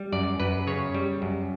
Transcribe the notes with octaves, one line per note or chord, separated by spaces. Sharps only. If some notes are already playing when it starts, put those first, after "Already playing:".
Already playing: G3
F#2 D5
F#2 B4
C#3 C#5
G3
F#2